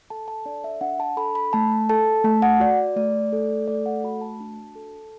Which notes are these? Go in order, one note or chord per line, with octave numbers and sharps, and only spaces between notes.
A4 A5
A5
D4 D5
E5
D4 F#5
A5
A4 B5
B5
A3 A5
A4 A5
A3 A5
F#5
F#4 D5
A3 D5
A4
A3 D5
F#5
F#4 B5
A5
D4
A4